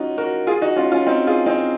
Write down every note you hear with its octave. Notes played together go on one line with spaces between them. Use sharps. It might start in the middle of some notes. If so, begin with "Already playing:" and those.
Already playing: C#4 D#4 F4 F#4
F#4 A#4
F4 G#4
D#4 F#4
C#4 F4
C#4 F4
C4 D#4
F4 G#4
C4 D#4